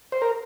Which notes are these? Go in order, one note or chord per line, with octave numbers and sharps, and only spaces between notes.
C5
A#4